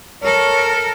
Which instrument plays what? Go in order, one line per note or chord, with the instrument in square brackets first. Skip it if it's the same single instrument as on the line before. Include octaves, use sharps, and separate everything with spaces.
[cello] A4 A#4 [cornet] C#5